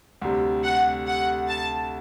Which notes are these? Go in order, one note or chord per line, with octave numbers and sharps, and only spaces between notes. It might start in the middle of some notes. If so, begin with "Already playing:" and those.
D2 C3 G3
F#5
F#5
A5